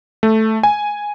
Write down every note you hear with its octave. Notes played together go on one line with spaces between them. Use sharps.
A3
G#5